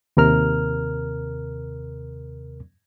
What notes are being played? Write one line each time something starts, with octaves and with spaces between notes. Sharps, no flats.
D#2 C3 A#4 F6